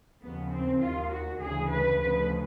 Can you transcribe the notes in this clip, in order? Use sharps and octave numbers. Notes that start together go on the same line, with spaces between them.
D#2 C#3 F3 B3
C4
D#2 D#3 F4
F#4
D2 C#3 E3 G#4
B4
D2 C#3 F3 B4